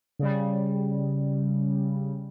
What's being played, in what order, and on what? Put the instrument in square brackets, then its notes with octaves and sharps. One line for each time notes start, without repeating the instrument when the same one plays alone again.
[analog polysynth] C#3 G3